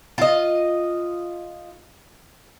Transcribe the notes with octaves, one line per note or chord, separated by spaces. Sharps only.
F4 D#5